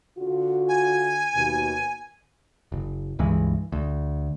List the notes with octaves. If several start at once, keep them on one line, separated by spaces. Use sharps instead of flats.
D3 F4 F#4
G#5
D#2 B2
F#1
C#2 G2 E3 G#3
D2